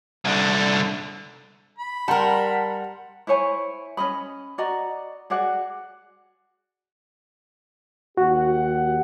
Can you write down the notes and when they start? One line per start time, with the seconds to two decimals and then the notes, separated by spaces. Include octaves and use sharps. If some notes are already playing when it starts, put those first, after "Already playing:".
0.25 C2 D3
1.79 B5
2.08 G3 A#4 F#5 A5 A#5 C6
3.27 E4 C5 C#5 G#5
3.97 C#4 F4 D#5 B5
4.58 F#4 D5 D#5 A#5
5.30 F#4 G#4 D5 F#5
8.17 D#2 F#4 G4 F#5